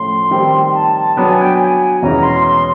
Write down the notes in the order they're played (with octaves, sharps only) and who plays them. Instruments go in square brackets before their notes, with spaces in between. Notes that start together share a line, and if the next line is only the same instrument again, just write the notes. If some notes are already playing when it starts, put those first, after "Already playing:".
Already playing: [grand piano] A2 F3 A3 C#4 [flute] C6
[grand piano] D#3 G3 C4
[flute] A5
A5
[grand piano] F#3 B3 D4 [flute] A5
[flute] G#5
G5
G#5
[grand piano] E2 B2 G#3 C#4 E4 [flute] A#5
[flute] C6
C6